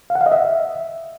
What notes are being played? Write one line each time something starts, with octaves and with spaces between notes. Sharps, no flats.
F5
F#5
F5
D#5
E5